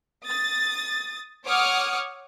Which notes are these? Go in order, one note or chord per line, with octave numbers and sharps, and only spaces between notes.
D#6 A6
C#5 F#5 D6 D#6 F6 C#7